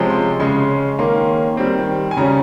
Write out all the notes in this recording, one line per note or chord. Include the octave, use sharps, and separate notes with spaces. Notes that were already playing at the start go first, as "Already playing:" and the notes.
Already playing: C3 F3 G#3 C#4
C6
C#3 G#3 C#4 C6
D#3 A#3 C#4 C6
D#3 G3 C4
G#5
C#3 G3 C#4 A#5